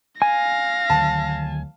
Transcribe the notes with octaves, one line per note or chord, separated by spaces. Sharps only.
F5 G#5 A#6
D2 D#3 F#3 A5